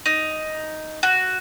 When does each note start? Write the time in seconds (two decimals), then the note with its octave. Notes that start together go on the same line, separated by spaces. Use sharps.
0.06 D#4
1.03 F#4